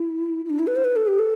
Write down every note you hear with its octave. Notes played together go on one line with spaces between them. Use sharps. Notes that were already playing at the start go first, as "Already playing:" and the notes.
Already playing: E4
E4
D4
E4
B4
C5
B4
A4
G4
A4